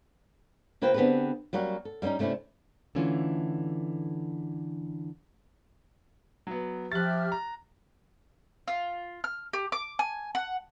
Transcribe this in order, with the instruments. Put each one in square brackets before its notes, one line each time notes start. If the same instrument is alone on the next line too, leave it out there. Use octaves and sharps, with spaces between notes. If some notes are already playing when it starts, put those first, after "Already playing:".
[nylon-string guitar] C#3 A#3 F4 B4 C5 G5
D3 B3 C4 G4 G#4 B4
F#3 G3 A#3 C#4 F#4
A4
G3 A#3 C4 C#4 D#4
C3 A3 C#4 D4 E4
D3 E3 A3 C#4 F4
[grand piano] F#3 B3
[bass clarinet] F3 [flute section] G4 E5 F6 [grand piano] F#6 A6
[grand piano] A#5
[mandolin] F4
F6
G4
D6
G#5
F#5